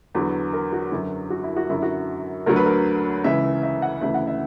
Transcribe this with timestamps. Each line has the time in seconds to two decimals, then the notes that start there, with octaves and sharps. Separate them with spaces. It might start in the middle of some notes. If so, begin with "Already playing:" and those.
0.15 E2 D3 F#3 B4
0.53 A#4
0.73 F#4
0.92 F#2 D3 F#3
1.30 F#4
1.44 E4
1.56 F#4
1.69 F#2 D3 F#3 E4
1.82 F#4
2.46 D2 D3 F#3 A#4
2.56 B4
2.66 A#4
3.24 C#2 C#3 E3 E5
3.63 E5
3.82 F#5
4.01 D2 C#3 E3 E5
4.14 F#5
4.27 E5